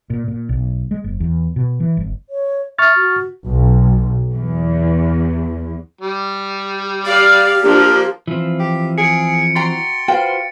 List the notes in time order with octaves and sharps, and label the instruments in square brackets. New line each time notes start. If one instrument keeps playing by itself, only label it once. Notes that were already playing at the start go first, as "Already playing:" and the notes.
[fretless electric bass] A#2
A#2
B1
G#3
F#1
E2
B2
E3
G1
[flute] C#5
[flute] E5 [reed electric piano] C#6 F6 A6
[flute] F#4
[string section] B1
E2
[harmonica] G3
[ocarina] G4 [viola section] D5 F5
[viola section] F3 D4 [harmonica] A#3
[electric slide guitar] E3 F3 C4
[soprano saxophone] G4
[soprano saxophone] G#4 [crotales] C#7 D7
[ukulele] F#4 G5 A#5 [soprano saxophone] C6 [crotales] A6
[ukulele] F4 F5 G5 [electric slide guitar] F#4 B4 C5